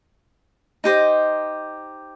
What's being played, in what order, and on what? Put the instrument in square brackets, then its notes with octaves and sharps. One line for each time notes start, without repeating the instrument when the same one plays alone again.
[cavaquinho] D#4 G4 C5 D#5